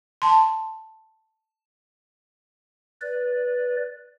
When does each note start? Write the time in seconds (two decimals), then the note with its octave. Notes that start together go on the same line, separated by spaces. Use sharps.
0.22 A5 C6
3.02 B4 D5